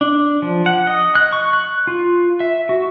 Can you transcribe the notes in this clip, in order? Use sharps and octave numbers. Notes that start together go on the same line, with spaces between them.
D4
F3
F#5
D#5
F#6
C#6
F#6
F4
E5
F#4